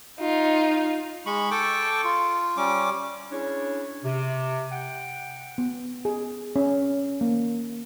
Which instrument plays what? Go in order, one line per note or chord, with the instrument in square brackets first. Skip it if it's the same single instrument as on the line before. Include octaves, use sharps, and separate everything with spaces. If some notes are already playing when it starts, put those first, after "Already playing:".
[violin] D#4 F4
[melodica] G#3 B5 C#6
A4 G5 C#6 D6
F4
G3 C#4 D6
[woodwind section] C#4 D4 E4 G#4 C#5
C3
F#5 G5
[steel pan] B3
G#4
C#4
A#3